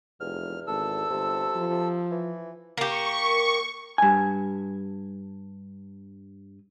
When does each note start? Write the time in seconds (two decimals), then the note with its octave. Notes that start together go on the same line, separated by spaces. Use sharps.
0.20 F1 E2 F6
0.67 G#1 A4 E6
1.10 G1 C3
1.56 F3
2.11 E3
2.77 A#3 G4 C#6
3.98 G2 G#5